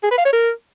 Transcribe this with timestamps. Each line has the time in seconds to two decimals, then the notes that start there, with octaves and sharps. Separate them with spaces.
0.03 G#4
0.11 B4
0.18 F5
0.25 C#5
0.33 A#4